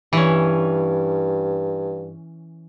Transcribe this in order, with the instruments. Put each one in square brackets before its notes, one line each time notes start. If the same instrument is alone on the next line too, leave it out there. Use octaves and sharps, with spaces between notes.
[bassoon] G2 [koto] E3 C#4